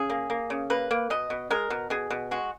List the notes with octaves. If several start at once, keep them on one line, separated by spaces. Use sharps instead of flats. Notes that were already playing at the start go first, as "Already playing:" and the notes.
Already playing: C#3 G#4
A#3
A#3
C#3
A#3 B4
A#3
B2 D#5
B2
G#3 A#4
B2
B2 G#4
B2
G#3 F#4